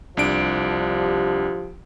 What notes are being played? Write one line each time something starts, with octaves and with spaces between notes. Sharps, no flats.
C2 F3 D4 G4 D7